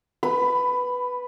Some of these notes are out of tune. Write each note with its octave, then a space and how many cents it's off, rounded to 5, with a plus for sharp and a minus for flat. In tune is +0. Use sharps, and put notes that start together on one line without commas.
B4 +0 B5 +15